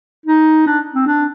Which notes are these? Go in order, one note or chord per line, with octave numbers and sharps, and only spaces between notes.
D#4
D4
C4
D4